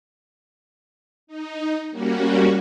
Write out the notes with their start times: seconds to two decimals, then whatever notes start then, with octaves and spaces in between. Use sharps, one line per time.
1.27 D#4
1.90 G3 A#3 C#4 F#4